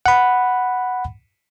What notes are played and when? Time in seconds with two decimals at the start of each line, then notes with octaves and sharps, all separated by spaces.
0.06 F#5 B5